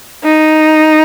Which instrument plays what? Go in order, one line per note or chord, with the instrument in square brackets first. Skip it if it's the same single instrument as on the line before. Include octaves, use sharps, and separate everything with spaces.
[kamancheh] D#4